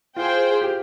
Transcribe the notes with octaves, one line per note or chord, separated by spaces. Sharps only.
F4 G#4 C5 G5
G4